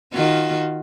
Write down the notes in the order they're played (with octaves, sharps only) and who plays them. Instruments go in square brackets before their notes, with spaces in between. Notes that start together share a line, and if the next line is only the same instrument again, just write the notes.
[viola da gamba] D#3 F4 F#4